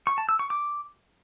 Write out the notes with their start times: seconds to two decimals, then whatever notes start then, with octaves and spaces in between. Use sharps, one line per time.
0.07 C#6
0.18 A5
0.29 E6
0.39 C#6
0.50 D6